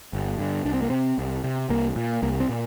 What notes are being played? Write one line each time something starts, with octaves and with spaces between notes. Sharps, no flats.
G1
G2 D3
C2 D4
C4
A#3
C3 C4
C2
C3
C2 A#3
A#2
C2 A#3
C4
A#2